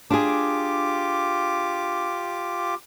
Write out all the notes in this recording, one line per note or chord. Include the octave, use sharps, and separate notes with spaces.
D4 F4 G4 G#4 D6